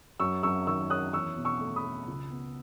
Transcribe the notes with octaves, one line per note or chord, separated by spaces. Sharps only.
F#2 C#6 E6
F#2 C#6 E6
D#3 C#6 E6
C#4 D#6 F#6
E2 C#6 E6
B2
C#6 E6
A3
B5 D#6
A3
C#2
B3